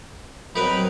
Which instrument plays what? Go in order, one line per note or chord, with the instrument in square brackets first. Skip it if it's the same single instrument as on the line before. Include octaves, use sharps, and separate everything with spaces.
[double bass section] F#3 C4 [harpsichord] D#4 A#4 B4 [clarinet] B5